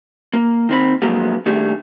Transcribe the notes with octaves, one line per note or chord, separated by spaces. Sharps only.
A#3
D#3 C4 B5
D3 F3 F#3 G#3 A#3 B3
D#3 G3 A3 D4 G#4